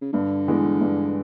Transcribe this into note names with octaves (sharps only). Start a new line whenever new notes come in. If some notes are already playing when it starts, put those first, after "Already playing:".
C#3
G2 D3
E3 G#3 B3
G2